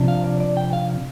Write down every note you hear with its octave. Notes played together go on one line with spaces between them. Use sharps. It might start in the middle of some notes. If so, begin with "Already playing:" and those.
Already playing: C3 F3 D4
F5
D5
D5
G5
F5